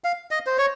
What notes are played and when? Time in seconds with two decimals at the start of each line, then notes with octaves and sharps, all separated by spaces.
0.04 F5
0.31 D#5
0.46 C5
0.58 C#5